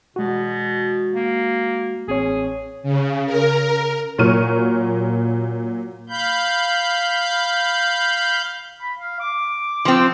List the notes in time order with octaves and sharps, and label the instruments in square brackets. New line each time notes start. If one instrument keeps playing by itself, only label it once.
[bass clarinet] B2 [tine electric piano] G#3 F#4
[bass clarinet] A#3
[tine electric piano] A1 C4 C#5 [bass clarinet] G#4
[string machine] C#3
A#4
[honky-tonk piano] A#2 F#3 A#4 C#6 F6 D#7
[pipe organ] F5 B5 G6
[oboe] B5
F5
D6
[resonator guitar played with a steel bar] F3 C4